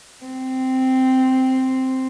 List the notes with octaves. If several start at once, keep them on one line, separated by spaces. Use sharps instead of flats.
C4